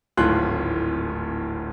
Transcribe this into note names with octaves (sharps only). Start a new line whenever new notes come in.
D1 G#1 A2 F4 C6 F#6